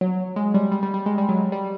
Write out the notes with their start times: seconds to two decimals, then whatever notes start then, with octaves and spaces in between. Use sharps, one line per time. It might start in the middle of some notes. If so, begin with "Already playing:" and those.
0.01 F#3
0.36 G#3
0.54 G3
0.72 G3
0.83 G3
0.94 G3
1.06 G#3
1.18 G3
1.29 F#3
1.52 G3